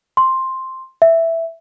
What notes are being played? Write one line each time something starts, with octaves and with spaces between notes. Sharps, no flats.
C6
E5